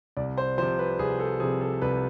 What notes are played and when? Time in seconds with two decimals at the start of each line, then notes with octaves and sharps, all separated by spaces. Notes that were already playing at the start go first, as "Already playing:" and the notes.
0.17 C2 D5
0.38 C5
0.58 F3 C5
0.62 C3
0.79 B4
0.99 C2 G#4
1.20 A4
1.40 C3 F3 G#4
1.61 A4
1.82 C2 B4